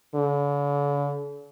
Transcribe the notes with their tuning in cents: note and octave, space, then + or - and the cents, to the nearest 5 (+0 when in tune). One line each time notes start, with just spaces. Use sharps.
D3 -45